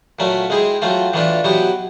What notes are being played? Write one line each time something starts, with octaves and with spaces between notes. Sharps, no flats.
A#2 F#3 A3 C#4
G#3 C4 E4 G#4
F#3 A3 C4 F4
A2 E3 A3 D4 F4
B2 F#3 B3 E4 G4